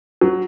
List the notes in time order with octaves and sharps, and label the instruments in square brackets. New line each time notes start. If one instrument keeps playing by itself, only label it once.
[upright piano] F#3